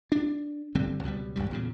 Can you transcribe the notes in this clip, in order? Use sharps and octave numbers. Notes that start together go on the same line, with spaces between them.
D4
G1 D3 G3 C4
C#2 B2 F3 G3
G#1 D2 G2 G3
E2 A#2 C#3